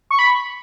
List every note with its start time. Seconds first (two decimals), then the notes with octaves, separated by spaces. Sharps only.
0.11 C#6
0.19 B5